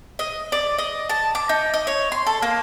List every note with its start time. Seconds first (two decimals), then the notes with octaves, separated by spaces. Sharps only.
0.19 D#5
0.52 D5
0.78 D#5
1.09 A5
1.35 D6
1.49 D#4
1.74 D#5
1.87 C#5
2.12 C6
2.26 A4
2.42 A#3